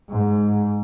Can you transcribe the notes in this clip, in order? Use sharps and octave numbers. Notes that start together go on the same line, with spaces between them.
G#2